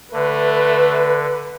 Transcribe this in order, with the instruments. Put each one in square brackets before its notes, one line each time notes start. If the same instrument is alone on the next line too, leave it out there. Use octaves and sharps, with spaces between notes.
[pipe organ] D3 [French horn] A3 [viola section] B4